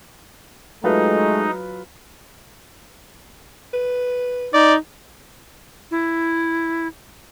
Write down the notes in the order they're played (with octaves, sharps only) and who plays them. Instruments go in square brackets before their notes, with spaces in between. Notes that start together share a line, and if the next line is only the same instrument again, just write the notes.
[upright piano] F#3 F4 B4 [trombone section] G#3 A3 [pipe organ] D#4
[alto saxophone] B4
[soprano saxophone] D#4 [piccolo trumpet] D5
[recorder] E4